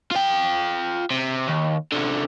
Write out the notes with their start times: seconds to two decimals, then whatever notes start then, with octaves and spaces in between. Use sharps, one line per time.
0.11 F4 G5
1.11 C3
1.47 D#2
1.92 C2 D3